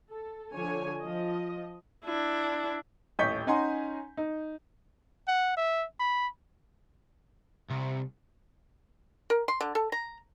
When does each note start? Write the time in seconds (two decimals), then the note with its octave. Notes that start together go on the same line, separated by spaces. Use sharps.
0.10 A4
0.54 D3 F3 C#5 G#5
1.00 F3 D#5
2.05 D4 E4
3.19 D#1 A1 D#5 C#6 G6 B6
3.47 C#4 D#4 F#5 G#5 A#5 C6
4.17 D#4
5.28 F#5
5.57 E5
6.00 B5
7.70 C2
9.30 A#4
9.48 C6
9.61 D3
9.75 A4
9.92 A#5